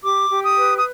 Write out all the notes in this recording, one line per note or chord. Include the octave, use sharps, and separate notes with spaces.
G4 D6
G4
D#6
B4
D#6